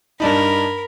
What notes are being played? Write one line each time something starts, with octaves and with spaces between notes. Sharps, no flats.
G2 D4 D#4 A#4 B5